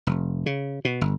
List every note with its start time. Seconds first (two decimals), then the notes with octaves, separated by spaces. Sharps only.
0.07 F1
0.46 C#3
0.85 B2
1.01 G1